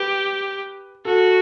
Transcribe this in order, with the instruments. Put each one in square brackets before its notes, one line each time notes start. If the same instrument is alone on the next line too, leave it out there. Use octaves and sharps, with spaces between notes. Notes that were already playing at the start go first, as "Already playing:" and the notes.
Already playing: [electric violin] G4 [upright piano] B4
[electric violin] F#4 [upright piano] A4